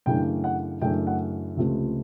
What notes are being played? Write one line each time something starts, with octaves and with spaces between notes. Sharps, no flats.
F#2 C#3 E3 A3 D4 G5
F#5
F#2 C#3 E3 A3 D4 G5
F#5
C#2 C3 F3 A3 C4